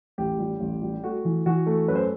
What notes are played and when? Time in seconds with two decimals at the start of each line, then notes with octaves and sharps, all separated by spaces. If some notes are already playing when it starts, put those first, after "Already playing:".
0.18 A1 G4
0.39 G3
0.60 A1
0.82 G3
1.03 A3 F#4
1.25 E3
1.46 E3 F#4
1.66 A3
1.88 F#2 B4
1.95 C5